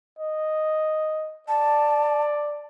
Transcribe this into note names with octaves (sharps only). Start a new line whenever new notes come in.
D#5
D5 A5